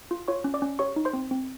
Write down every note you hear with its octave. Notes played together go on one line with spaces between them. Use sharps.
F4
F4 C#5 C#6
C#4
D5 D6
C#4
G4 C#5 C#6
D#4
C5 C6
C4
C4